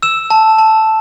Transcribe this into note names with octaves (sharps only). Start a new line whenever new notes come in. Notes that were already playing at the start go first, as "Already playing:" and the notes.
E6 E7
A5
A5